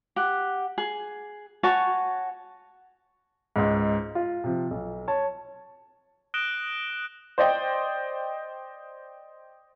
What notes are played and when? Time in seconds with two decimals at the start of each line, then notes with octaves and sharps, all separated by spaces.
0.16 G4 F#5
0.78 G#4
1.63 F#4 C#5 G#5 A5
3.56 C#2 G#2
4.15 F4
4.44 C3 F3
4.71 B1
5.08 C#5 A5
6.34 D#6 F#6 A#6 D7 E7 G7
7.38 C5 D5 D#5 G5